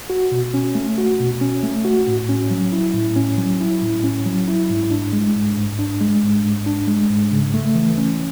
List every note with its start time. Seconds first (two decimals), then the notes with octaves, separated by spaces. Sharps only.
0.10 F#4
0.32 B2
0.54 C#4
0.75 A3
0.98 F#4
1.20 B2
1.41 C#4
1.63 A3
1.85 F#4
2.07 A2
2.29 C#4
2.51 F#3
2.72 E4
2.94 A2
3.16 C#4
3.38 F#3
3.60 E4
3.82 A2
4.04 C#4
4.26 F#3
4.48 E4
4.70 G#2
4.91 D4
5.13 G#3
5.35 G#2
5.57 G#2
5.79 D4
6.01 G#3
6.23 G#2
6.45 G#2
6.66 D4
6.88 G#3
7.10 G#2
7.32 C#3
7.54 A3
7.75 E3
7.98 C#4